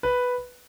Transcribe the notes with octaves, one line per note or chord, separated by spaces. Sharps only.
B4